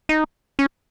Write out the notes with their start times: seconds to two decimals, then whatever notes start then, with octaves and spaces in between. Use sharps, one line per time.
0.09 D#4
0.59 C#4